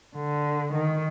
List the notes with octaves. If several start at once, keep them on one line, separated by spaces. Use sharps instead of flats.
D3
D#3